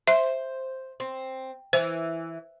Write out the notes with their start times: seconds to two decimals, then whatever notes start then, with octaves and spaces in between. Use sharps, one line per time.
0.07 C5 E5
1.00 C4
1.73 E3 C5